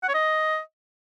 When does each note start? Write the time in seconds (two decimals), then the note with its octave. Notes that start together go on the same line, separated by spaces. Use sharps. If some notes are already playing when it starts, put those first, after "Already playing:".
0.03 F#5
0.09 C#5
0.14 D#5